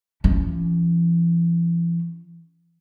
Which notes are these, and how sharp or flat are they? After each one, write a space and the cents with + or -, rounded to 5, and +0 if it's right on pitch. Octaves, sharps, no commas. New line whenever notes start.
E3 +45 C#4 +0